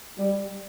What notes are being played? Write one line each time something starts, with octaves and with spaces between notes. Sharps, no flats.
G3